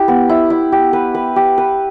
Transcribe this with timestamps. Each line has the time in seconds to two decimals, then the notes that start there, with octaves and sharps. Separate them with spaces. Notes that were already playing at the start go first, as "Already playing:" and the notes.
Already playing: E4 G4
0.08 B3
0.29 E4
0.50 E4
0.72 G4
0.93 B4
1.14 B4
1.36 G4
1.58 B4